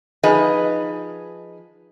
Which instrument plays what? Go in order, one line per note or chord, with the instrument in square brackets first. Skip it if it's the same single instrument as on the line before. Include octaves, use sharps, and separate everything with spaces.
[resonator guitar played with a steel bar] F3 D#4 G#4 B4 D#5